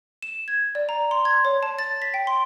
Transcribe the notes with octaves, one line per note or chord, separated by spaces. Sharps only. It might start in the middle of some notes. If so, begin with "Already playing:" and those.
E7
G#6
D5
A#5
C6
G#6
C#5
A5
A6
B6
G5
C6